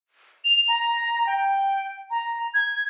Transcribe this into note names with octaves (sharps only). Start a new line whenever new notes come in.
F7
A#5
G5
A#5
G#6